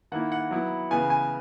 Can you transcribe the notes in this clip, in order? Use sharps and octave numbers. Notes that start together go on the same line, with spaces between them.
D#3 A#3 E4 F#5
F#5
F#3 B3 E4
C#3 E3 B3 G#5
G#5